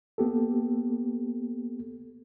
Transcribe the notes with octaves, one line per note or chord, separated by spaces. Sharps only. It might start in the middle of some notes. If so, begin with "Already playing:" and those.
A#3 B3 G4 A4